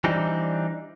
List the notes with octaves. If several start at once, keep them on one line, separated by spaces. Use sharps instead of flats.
E3 G3 C4 D4 D#4